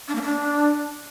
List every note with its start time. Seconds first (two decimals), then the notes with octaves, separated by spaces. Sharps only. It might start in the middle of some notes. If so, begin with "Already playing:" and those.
0.08 D4
0.15 A#3
0.23 D4